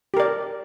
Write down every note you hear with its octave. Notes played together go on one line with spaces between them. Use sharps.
G4 A#4 D5